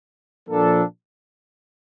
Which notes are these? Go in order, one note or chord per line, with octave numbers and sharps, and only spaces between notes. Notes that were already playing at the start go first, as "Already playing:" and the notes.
A#2 F3 A#3 D4 A4